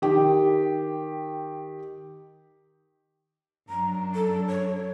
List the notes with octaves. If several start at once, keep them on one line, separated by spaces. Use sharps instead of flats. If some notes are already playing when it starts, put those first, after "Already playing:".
D#3 G4
F#2 F#3 D4 A#5
A4
C#5